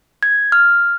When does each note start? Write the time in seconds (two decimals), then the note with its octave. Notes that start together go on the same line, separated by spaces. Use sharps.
0.23 G#6
0.52 F6